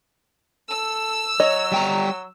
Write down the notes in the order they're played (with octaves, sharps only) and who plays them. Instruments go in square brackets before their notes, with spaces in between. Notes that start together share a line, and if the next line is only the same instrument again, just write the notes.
[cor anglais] A4 [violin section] E6
[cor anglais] F#3 [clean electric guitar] C#5 [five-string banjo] D#5
[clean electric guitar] G3 G5 A#5